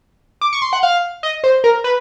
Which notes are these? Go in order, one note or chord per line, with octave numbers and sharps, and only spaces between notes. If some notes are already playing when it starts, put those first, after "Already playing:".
D6
C#6
C6
F#5
F5
D#5
C5
A#4
B4